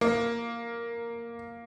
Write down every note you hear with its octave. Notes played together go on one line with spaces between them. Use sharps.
A#3